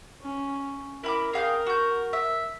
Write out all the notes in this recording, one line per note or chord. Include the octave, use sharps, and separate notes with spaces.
C#4
E4 A#4 B5 D6
G#4 F5 G5
F#4 G6
E5